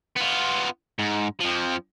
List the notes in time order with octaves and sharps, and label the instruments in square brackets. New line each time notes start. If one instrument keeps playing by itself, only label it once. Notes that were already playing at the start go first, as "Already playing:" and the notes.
[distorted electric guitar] B3 F4
G#2
F2 F3